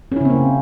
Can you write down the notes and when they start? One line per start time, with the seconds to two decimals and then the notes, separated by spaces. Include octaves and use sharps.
0.12 C#4
0.16 E4
0.21 C#3
0.25 C4
0.30 A#3